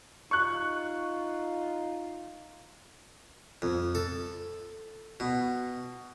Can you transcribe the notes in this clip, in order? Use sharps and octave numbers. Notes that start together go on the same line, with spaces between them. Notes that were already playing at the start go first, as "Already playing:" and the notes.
D#4 F4 C#6 F#6
F2
A4
B2